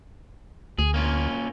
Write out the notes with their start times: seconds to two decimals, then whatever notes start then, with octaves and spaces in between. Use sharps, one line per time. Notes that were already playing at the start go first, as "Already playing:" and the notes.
0.79 D2 G#4
0.94 A#3 C#4 F4